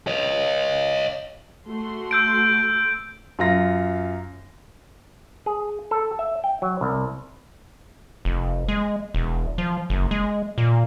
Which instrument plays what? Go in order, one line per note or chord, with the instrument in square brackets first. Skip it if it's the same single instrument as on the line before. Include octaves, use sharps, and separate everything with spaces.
[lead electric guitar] C#5 D#5
[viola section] A3 F#4 C6
[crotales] E6 G6 D7
[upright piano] F#2 F4 A#6
[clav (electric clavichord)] G#4
A4
E5
G5
F#3
C2
[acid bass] F1
G#3
E1
F3
F#1
G#3
A#2